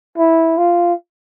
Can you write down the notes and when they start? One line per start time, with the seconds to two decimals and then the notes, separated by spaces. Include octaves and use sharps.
0.18 E4
0.57 F4